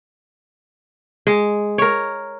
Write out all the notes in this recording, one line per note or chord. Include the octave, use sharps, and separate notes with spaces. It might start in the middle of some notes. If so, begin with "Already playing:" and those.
G#3
A#4 C#5